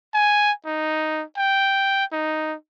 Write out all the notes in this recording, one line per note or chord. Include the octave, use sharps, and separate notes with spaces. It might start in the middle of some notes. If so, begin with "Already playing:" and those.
G#5
D#4
G5
D#4